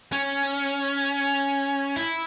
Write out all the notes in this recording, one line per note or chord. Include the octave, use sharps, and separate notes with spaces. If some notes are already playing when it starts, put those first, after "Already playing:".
C#4
E4